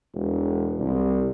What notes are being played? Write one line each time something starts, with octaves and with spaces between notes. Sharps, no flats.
E1
C2